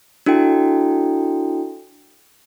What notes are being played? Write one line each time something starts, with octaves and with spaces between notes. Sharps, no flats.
D4 E4 F#4 A4 G5